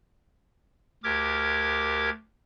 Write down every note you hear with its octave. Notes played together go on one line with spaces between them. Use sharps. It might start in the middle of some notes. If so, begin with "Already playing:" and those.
D2 G4 A#4 D6 G#6